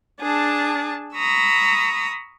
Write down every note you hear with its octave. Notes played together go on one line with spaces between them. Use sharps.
D4 G#4 A5
A#5 B5 C#6 D#6 E6